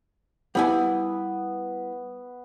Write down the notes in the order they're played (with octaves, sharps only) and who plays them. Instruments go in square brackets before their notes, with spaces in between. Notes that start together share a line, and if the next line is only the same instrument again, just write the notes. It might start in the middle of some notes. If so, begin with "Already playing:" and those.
[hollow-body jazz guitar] G3 E4 G#5 [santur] B3